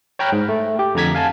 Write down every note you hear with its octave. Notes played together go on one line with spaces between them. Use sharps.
C#5 G5 A#5 B5 F6 F#6
G#2
A3
G4
F2 D3 A#5 G#6 B6
F5 G#5 A5